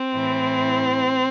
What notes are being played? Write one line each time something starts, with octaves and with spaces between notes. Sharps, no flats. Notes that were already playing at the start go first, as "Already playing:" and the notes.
Already playing: C4
A2 E3